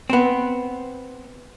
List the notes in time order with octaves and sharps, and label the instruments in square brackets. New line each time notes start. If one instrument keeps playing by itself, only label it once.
[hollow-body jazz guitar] B3 C4